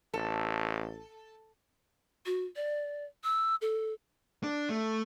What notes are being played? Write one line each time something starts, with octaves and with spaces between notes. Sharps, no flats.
A1 A4
F#4
D5
E6
A4
D4
A3